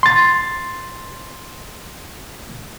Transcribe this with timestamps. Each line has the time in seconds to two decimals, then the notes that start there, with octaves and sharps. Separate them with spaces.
0.03 C6 A6